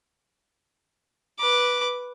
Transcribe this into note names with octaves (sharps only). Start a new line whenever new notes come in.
B4 D6